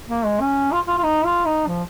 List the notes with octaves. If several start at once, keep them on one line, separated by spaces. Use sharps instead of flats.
A#3
G#3
C#4
F4
F4
F4
D#4
F4
D#4
F3